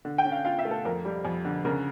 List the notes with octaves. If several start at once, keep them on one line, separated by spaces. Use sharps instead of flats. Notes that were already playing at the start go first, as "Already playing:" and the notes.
D3
G5
C#4
F5
F4 F5
E5
A3
A4
F2 A#4
G3
F2
D3
C#3 A#4